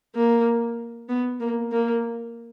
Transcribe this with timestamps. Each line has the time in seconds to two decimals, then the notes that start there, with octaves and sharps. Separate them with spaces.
0.15 A#3
1.09 B3
1.40 A#3
1.72 A#3